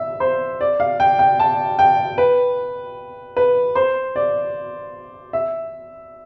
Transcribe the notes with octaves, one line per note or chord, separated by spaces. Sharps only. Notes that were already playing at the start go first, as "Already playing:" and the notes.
Already playing: E5
C5
D5
F5
G5
G5
A5
G5
B4
B4
C5
D5
E5